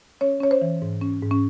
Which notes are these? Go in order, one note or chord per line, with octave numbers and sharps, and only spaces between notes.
C#4 C#5
C#4 C#5
C5
E3
G#2
C#4
G#2
C#4